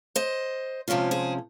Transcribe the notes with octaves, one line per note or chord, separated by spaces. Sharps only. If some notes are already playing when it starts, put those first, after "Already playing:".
C5 D#5
C3 F3 G#3 C#4 F4
G#4 C5